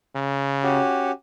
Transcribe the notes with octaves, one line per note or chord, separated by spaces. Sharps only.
C#3
C#4 F#4 G4